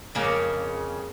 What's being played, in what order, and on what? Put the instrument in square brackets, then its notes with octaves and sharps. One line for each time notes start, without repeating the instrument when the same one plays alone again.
[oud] F2 C#3 A#3